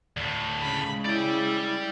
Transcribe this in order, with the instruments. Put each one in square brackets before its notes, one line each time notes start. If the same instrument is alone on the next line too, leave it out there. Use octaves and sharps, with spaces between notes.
[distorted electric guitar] D2 A2
[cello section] C#3 G#3 [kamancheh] B5
[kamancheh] E4 [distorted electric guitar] D5 G5